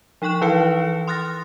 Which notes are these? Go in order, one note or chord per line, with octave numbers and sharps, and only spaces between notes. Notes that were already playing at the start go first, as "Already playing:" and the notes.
F3 D#4 G5 C#6 F#6 E7
E3 E4 B4 F5 G5 C#7
C6 D#6 F6 F#6 A6 A#6